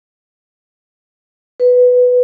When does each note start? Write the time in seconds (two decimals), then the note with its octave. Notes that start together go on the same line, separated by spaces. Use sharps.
1.60 B4